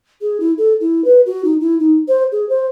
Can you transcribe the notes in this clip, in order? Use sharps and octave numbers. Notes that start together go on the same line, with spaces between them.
G#4
E4
A4
E4
B4
F#4
D#4
E4
D#4
C5
G#4
C5